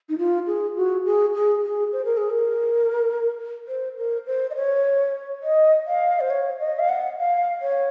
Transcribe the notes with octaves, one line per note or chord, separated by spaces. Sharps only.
D#4
F4
G#4
F#4
G#4
G#4
G#4
C5
A#4
G#4
A#4
C5
A#4
C5
D#5
C#5
D#5
F5
C5
C#5
D#5
F5
F#5
F5
C#5